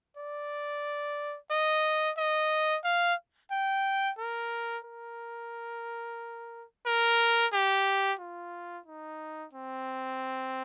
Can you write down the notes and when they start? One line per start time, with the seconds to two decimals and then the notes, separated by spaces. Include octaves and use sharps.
0.17 D5
1.51 D#5
2.18 D#5
2.84 F5
3.51 G5
4.19 A#4
4.85 A#4
6.86 A#4
7.53 G4
8.19 F4
8.86 D#4
9.53 C4